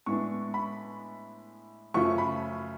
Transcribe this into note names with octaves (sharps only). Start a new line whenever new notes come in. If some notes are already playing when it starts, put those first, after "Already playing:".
A2 G#3 B3 D4 C#6
B5
F#2 C#3 F3 A3 C#6
B5